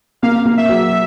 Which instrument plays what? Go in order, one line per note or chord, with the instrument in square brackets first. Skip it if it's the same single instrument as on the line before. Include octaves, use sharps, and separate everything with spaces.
[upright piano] A#3 [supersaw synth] F5
[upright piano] A#3
[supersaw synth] E5
[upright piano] F#3